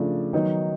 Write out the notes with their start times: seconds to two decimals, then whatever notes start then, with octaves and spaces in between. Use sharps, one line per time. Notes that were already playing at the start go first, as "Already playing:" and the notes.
Already playing: C#3 F3 A3 D4
0.33 D#3 F#3 B3 D#4